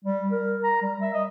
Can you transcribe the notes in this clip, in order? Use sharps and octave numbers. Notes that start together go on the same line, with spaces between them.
G3
A#4
A#5
G3
E5
D#5